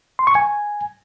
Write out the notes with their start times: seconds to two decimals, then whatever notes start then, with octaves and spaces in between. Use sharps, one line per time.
0.19 C6
0.27 C#6
0.35 G#5